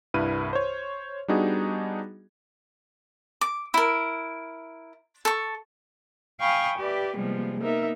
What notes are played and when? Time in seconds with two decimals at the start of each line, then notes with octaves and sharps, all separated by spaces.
0.14 C2 G2 E4 B4 F6 D#7
0.53 C5 C#5
1.28 G3 B3 D4 D#4 F#4 G#4
3.41 D6
3.74 E4 A#4
5.25 A4 C#6
6.40 F5 G5 G#5 B5 C#6 D#6
6.78 G4 B4 D5 E5
7.16 C3 F3 G3 G#3 A#3 B3
7.59 A#3 B3 D#4 A#4 E5